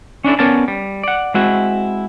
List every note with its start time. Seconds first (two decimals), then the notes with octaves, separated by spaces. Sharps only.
0.24 C#4 D4 E4 A4
0.39 B3 C#4 A#4 C#5 D5 A5
0.68 G3
1.04 D5 F#5
1.34 G#3 C4 E4 F#4